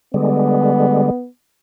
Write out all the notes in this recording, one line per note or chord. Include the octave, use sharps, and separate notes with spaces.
D3 G3 G#3 B3